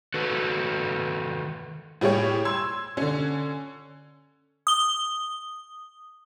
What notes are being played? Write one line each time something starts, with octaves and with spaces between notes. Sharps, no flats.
D#3 F#4 A4 B4
A2 G3 E4 G#4 C#5 G5
C6 E6 G#6
D3 C#4
D#6 G7